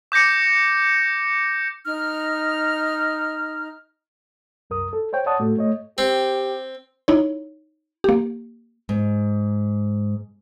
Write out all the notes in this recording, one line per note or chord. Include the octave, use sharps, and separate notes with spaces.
D6 G6 A#6 C#7
D#4 F6
C2 F#2 A#4 D#6
A4
C5 C#5 G5
C#5 D5 F#5 A5 D#6
A2 A3 F#4 A4
A3 C#5 D#5
C4 G4
D#4 E4 C#5
A#3 G4
G#2